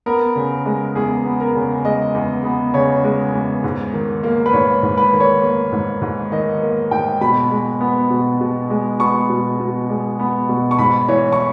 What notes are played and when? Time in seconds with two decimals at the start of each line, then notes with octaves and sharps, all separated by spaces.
0.06 B3 A#4
0.36 C#3
0.66 G#3
0.95 E2 G#4
1.25 B3
1.40 A#4
1.55 C#3
1.85 G#3 D#5
2.15 E2
2.45 B3
2.74 C#3 C#5
3.04 G#3
3.34 E2
3.64 G#2
3.93 D#3
4.23 A#3
4.46 B4
4.53 G#2 C#5
4.83 G#2
4.97 B4
5.13 D#3
5.20 C#5
5.43 A#3
5.72 G#2
6.02 G#2
6.32 D#3 D#5
6.62 A#3
6.91 G#2 G5
7.21 B2 B5
7.51 G#3
7.81 B3
8.10 B2
8.41 B2
8.70 G#3
9.00 B3 C#6
9.30 B2
9.60 B2
9.90 G#3
10.19 B3
10.49 B2
10.71 C#6
10.79 G#2 B5
11.08 E3 C#5
11.32 C#6